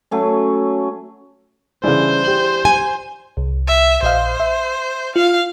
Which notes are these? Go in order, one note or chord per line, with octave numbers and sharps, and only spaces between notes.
F#3 A3 C#4
C#3 E3 G3 D4 C5
G4 F#7
G#5
C2
E5
A#1 C5 D#5 F5
E5
F4 F5